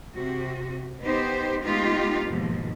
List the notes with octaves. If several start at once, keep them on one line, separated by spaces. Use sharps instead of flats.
C3 F#4
B3 D#4 G4 C5
G#3 A3 B3 D#4 F4 G4
D#2 G#2 B2 F3